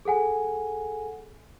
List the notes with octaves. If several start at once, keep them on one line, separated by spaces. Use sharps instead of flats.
G#4 A4 F#5 G#5